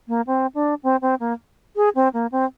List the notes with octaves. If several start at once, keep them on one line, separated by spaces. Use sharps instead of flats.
A#3
C4
D4
C4
C4
A#3
G#4
C4
A#3
C4